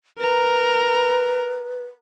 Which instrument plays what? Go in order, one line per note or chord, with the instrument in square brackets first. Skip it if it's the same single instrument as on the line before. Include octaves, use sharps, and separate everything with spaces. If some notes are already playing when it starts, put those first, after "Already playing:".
[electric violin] A#4 A#5 [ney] B4